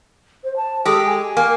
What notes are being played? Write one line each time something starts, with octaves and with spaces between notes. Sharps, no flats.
C5
A5
G#3 G4 A4
G#5
A#3